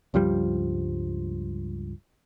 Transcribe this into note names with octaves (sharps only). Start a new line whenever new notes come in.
C#2 G2 F3 G3